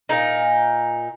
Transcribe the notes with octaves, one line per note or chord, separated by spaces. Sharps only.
A#2 D#4